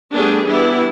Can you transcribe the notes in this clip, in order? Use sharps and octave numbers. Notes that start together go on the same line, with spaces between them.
G3 A3 B3 D4 G4 G#4
E3 G3 B3 D4 E4